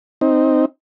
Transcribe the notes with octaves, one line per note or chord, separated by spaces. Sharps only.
C4 D#4